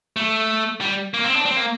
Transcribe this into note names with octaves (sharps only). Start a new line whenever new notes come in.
A3
G3
A#3
C4
D4
C4
A#3